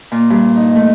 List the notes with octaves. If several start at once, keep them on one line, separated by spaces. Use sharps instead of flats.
A#2
G2
D#4
A3